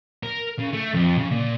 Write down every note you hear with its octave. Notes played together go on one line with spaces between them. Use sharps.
A#4
C#3
A3
F2
C#3
A#2